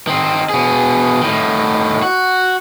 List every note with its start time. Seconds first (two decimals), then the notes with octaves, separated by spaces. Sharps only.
0.07 D#3 C4
0.49 B2 G#4
1.22 A2 D#3
2.03 F#4